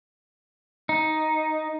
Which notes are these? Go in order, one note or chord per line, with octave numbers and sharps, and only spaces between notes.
D#4